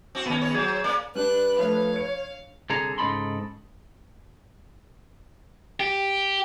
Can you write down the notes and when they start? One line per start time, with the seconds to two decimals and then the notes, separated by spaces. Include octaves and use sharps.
0.15 C4 F#4
0.26 D#3 A3 B3 C#4
0.41 C#3 C#5
0.55 F#3 G#4 C5
0.84 C#3 A#3 D5
1.15 G3 D4 B4 F#6
1.58 F3 A3 C#5 F5
1.96 C#7
2.70 C2 D3 G#4 A4 A#5
2.98 G#2 C#3 D#4 A4 B5 C6
5.80 G4